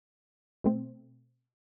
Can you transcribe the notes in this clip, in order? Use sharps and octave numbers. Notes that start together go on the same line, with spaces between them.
B2 A3 C4